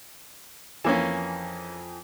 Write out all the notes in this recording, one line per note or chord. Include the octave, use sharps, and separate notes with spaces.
F2 E3 A#3 C#4 G#5 E7